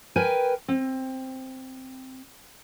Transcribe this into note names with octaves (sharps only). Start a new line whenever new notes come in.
A#4 B4 G5 G#5
C4